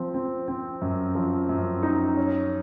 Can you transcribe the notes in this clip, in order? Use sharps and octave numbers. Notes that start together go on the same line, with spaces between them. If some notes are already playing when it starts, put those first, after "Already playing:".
Already playing: F3 C4
C4
C4
F#2
F3
F#2
D#4
C#4